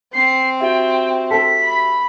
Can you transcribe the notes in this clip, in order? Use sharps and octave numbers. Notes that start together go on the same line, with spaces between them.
C4 C7
F#4 G4 E5 G5
A4 B6
B5